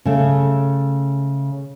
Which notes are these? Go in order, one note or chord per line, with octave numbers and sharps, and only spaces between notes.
C#3 A3